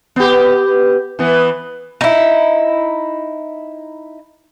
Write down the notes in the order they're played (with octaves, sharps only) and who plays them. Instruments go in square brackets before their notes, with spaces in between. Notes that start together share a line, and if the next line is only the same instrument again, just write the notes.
[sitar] B3 G4
E3 B3
[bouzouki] D#4 E4